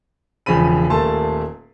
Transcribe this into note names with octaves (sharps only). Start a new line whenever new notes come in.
E1 C#3 F3 B5 D#7
D#1 A3 A#3 A5 C6